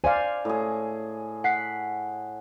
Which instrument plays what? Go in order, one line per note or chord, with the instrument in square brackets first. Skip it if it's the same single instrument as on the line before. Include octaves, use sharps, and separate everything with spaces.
[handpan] C5 D5 F5 [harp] G#5
[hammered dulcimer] A2 G#4
[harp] F#5 B6 C7